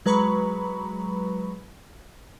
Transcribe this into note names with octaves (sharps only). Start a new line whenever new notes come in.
F#3 G#3 B4 A#5 B5 C#6